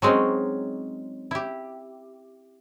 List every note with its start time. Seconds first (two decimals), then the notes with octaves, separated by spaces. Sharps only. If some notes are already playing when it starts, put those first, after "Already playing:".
0.02 F#3 G#3 C4 C#4 D#4
1.31 E4 G4